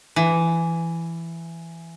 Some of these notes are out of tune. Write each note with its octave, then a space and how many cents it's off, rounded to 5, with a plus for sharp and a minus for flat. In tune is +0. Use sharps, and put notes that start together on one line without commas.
E3 +15